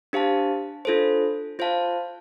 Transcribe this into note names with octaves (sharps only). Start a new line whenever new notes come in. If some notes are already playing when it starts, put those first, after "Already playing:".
D4 G4 C5 F5 A5
D4 F4 A4 C5
F4 C5 F5 A5